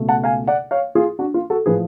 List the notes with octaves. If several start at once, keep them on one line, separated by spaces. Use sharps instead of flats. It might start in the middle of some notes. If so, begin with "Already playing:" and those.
Already playing: C#2 B2 A3
F#5 A5
F5 G#5
D5 F#5
C#5 F5
F4 G#4
D4 F#4
F4
F#4 A4
A2 F3 A3 G#4 B4